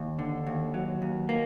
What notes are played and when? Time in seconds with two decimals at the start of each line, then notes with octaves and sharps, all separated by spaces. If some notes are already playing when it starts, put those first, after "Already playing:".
Already playing: D#2
0.19 D3
0.46 D#2
0.74 F#3
1.02 D#2
1.29 A#3